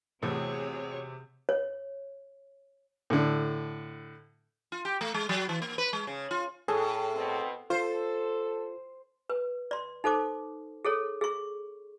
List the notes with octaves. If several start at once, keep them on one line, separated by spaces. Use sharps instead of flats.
E2 A2 C3 C4 F#4 G#4 A4 C#5
C#5
A2 D3
F4
G4
A3
G#3
F#3
E3
A#3
B4
G#3
C#3
F4
A2 G#4 A4 A5
B2 B3 C4
F4 A4 C5
B4
D5 C6
D#4 A4 C5 D6
G#4 A4 C#5
G#4 C#6